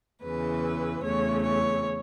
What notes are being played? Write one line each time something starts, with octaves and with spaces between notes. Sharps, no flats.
E2 C#3 E3 B4
E2 C#3 A3 C#5
C#5